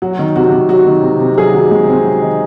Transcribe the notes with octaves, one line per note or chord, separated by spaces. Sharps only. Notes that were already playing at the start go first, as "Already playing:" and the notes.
F#3 F#4
D#3
C3 F#4
C3
F#3 F#4
D#3
C3
C3
F#3 G#4
D#3 F#4
C3 G#3
C3 C4
F#3
D#3